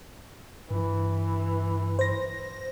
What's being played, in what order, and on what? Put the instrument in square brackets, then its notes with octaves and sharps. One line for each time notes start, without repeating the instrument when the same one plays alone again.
[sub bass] G2 [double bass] E3
[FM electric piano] C5 A#6